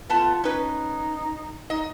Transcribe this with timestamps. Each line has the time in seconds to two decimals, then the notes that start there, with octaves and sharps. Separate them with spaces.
0.10 A3 B3 F4 A5
0.44 C#4 D#4 B4
1.70 D#4 D#5